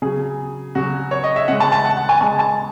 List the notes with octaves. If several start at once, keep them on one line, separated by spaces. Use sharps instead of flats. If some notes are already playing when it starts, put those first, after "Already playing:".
C#3 F#3 G#4
C#3 F#3 F#4
C#5
D#5
E5
C#3 G#3 F#5
A5
A5
F#5
F#5
G#5
C#3 G#3 A5
A5